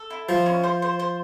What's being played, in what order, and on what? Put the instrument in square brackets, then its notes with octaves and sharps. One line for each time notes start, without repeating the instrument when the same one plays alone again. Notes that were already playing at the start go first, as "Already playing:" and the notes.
Already playing: [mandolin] A4
E4
[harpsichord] F3 [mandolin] C5
[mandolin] C#4
C5
C5
C5